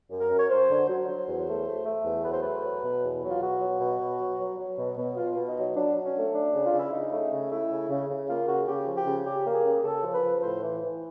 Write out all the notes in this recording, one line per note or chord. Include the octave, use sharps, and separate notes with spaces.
F#2
A#4
F#2
C#5
F#2 C5
D3
F#3
F#3 C5
E2
A3
A3
A3
E2
F#3 B4
C5
A3 B4
F#3
B2
E2
F#3
F4
B2 F#4
F#3
B2
B2
F#3
F#3
F#3
B2
B2
B2 F4
B2
D#4
F#3
F#3 D4
F#3
C#4
A3
F#3 D4
C#3
F4
C#3
E4
C#3 D#4
A3
C#3
A3 E4
C#3
C#3
C#3
A#3 F4
C#3 F#4
C#3 G4
F3
G4
C#3
C#3 G4
A#3
G#4
C#3
C#3 A4
F3
B4
F3
A2 C5
E3
E3